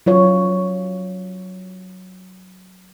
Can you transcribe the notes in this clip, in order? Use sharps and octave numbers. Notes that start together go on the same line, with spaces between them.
F#3 F4 C#5